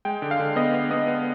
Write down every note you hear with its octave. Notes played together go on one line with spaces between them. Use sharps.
G#3 G5
D3
F5
D3
B3 D#5
B3
B3 D#5
B3